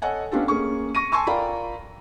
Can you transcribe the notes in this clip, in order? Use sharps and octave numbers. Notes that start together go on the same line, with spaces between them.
A4 C#5 D#5 F#5 G#5
B3 C#4 D4 F4 G4 A4
A#3 C#4 G#4 C#6
C#6 A#6 D#7
G#5 A5 C6 C#6 E6
F4 A#4 D5 G5 A#5 B5